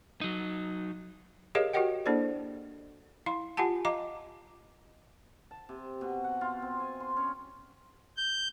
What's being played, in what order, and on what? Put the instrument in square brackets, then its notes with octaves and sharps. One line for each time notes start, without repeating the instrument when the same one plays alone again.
[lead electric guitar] F#3 D#4
[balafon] G4 G#4 A#4 C#5 D#5 F5
F#4 G4 A#4 D#5 F#5 G5
A#3 D4 E4 A4 C5 D5
E4 F5 C6
F4 G4 F#5 G#5 A5
D#5 F5 A#5 D6
[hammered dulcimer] A5
C3
B2
F#5
F4
C4
G#5
C6
C#4
[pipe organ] G6